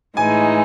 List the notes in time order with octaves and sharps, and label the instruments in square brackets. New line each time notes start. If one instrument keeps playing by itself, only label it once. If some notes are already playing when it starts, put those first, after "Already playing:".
[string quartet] A2 E3 G#3 D#4 [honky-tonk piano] G#5